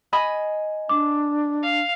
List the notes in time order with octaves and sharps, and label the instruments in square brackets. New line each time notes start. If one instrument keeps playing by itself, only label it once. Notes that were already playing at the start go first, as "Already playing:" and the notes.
[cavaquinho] D#5 G#5 B5
[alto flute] D4 [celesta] D6
[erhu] F5